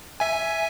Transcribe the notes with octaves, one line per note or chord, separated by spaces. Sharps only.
E5 G#5